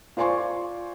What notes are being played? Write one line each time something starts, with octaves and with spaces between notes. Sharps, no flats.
F4 C5 D5 G#5 C6 C#6